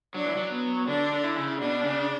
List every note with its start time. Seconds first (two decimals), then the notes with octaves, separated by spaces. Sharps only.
0.15 F#3 D4
0.25 E3
0.36 F#3
0.52 B3
0.87 D3 D4
1.12 D3
1.24 E4
1.36 C#3
1.60 B2 D4
1.84 C#3